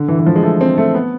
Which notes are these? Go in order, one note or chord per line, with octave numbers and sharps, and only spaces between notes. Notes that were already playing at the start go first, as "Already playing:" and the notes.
Already playing: D3
E3
E3
F3
G#3
A3
C4
A3
B3